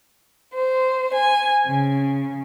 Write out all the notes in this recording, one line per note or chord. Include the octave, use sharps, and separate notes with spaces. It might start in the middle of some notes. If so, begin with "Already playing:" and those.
C5
G#5
C#3